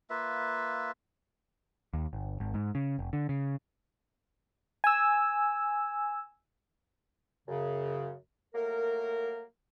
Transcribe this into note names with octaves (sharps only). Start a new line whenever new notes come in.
A#3 F4 B4 E5
D#2
G1
G#1
G#2
C#3
F1
D3
C#3
G#5 E6
F#2 C#3
F#3 A3 A#3 A#4